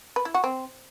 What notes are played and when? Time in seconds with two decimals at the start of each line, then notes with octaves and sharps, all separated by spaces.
0.16 B4
0.25 E4
0.34 F#4
0.44 C4